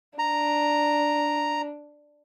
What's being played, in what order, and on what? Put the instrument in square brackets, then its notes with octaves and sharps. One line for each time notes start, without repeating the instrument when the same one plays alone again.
[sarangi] D4 [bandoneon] A#5